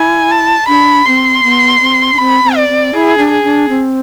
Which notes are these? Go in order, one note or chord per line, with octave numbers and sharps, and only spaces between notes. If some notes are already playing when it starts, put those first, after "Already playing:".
Already playing: E4 G#5
A5
D4 B5
C4 C6
B3
C4
D4
C4 B5
C4
D5
C4
E4 G#4
D4
G#4
D4
C4